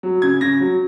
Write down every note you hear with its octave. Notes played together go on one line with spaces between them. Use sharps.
F#3
C#3 G#6
C#3 A#6
F#3